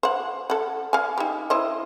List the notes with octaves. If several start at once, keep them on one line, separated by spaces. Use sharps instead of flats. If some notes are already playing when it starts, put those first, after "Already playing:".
C5 F#5
A4 F#5
F5 G#5
D#4 G4
E4 C5 D#5